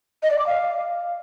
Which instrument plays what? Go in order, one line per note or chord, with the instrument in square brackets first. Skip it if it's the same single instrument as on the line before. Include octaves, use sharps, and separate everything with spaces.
[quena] D#5
D5
D6
F5